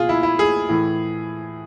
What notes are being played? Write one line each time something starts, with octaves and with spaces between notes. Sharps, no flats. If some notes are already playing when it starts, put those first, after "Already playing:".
Already playing: B2 F4 G#4
E4
E4
G#4
A2 E3